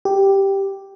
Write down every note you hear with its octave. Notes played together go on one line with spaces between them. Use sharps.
G4